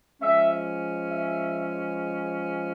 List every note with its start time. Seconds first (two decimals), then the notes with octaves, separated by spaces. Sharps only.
0.20 F3 G#3 C#4 E5
1.11 E5